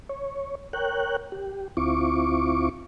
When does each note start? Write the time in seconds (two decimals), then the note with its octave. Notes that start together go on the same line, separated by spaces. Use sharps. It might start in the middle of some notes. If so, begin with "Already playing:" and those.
0.09 C#5
0.73 A#4 C#5 G5 F#6
1.32 G4
1.77 D2 C4 E4 F4 C#6 D6